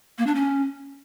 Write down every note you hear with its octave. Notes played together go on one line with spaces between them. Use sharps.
A#3
D4
C#4